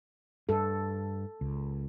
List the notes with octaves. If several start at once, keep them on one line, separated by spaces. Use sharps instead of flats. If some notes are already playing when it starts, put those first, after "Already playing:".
G2 A4
C#2